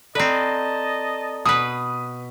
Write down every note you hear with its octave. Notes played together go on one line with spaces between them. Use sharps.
C4 A4 B4 D5 D#5 A5 A#5
B2 B4 D#6